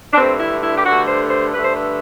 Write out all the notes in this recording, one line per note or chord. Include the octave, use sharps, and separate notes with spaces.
D4
G2 D3 A3 C4
E4
E4
G4
G2 D3 A3 F#4
C5
C5
G2 D3 A3 B4
C5
B4